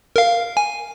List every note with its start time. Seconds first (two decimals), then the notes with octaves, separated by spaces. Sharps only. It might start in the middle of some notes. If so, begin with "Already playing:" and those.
0.16 A#4 F5
0.57 G#5